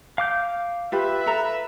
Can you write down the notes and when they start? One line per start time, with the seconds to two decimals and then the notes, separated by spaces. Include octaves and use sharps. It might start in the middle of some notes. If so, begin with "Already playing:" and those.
0.18 F5 D6 G6
0.92 F4 G4 B4 E5
1.26 A4 A#5